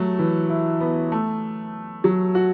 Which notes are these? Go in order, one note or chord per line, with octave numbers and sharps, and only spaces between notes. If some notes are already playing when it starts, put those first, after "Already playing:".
Already playing: F#3 A3
E3
E4
B3
A3
F#3
F#4